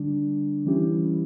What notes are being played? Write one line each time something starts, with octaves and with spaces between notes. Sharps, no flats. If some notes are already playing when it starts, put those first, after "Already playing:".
Already playing: D3 G3 D4
E3 G3 C#4 E4 G4